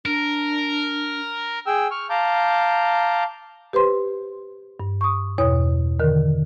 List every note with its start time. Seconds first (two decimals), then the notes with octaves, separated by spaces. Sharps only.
0.06 D4 A#4
1.66 G#4 G5 E6
1.91 C#6 F6
2.10 F5 A5 A#5 D6 G6
3.73 G4 B4 C5 C6
4.80 G2
5.01 C#6 D#6
5.38 E2 B2 C#5 D#6
5.99 D3 D#3 A#4